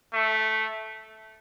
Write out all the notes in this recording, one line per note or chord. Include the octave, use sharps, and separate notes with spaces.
A3